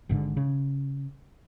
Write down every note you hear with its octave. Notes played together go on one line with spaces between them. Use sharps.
G#1 G#2 D3
C#3